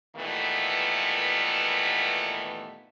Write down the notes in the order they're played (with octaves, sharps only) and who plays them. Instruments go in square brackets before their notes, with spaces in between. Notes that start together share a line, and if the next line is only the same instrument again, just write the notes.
[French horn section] G2 A#2 D#3 E3 A3 B3